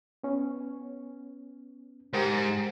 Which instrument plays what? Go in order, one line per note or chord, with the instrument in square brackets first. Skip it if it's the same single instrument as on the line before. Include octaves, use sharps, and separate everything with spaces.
[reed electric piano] B3 C#4
[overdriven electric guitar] G#2 [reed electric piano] G4 A#4 C5